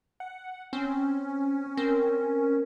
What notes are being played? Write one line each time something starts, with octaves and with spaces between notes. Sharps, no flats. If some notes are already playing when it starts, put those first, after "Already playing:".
F#5
C4 C#4
C4 A#4